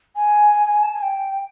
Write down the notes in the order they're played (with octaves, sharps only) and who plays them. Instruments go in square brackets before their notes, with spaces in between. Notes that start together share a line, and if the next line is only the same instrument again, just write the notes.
[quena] G#5
A5
G#5
G5